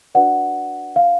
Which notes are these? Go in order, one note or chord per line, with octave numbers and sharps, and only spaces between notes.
D4 F#4 B4 D5 F#5
F5